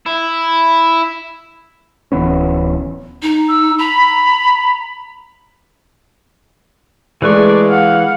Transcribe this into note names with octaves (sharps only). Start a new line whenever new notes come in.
E4
D1 E3 B3 C#4
D#4
E6
A#5 B5
E3 G#3 A3 B4 D5 C#6
F5 F#5